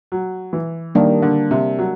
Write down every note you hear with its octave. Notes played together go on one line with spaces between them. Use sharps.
F#3
E3
D#3 G3 A#3 D4
D3
C3
F#3